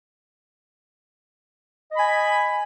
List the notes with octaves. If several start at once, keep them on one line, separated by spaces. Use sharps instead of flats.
D#5 G#5 B5